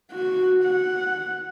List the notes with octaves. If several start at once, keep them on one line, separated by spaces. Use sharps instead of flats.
F#4
F#5